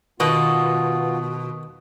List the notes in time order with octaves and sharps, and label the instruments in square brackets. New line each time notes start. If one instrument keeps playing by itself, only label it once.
[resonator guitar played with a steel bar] B2 [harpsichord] D#3 [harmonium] B3 F4 [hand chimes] C#6 D#6